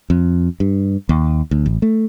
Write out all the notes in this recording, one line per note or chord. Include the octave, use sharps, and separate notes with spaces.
F2
G2
D#2
D2
A1
A3